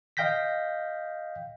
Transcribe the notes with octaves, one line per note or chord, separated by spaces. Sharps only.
D#5 F5 G5 G6 A#6 B6